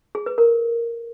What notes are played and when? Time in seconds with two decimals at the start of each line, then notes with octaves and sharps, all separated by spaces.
0.15 G#4
0.26 B4
0.38 A#4